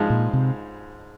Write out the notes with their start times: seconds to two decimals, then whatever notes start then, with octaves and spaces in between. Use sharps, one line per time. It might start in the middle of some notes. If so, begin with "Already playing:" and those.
Already playing: G#2 F3 G#3
0.10 A#2
0.33 C3